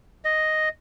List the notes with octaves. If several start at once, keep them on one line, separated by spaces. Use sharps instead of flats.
D#5